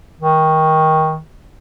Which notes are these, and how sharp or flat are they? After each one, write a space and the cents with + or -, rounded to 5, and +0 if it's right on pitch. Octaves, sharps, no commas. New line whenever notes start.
D#3 +20